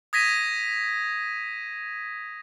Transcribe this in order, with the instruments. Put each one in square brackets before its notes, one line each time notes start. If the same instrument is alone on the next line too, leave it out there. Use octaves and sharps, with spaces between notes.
[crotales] D#6 G#6 A#6 B6 D#7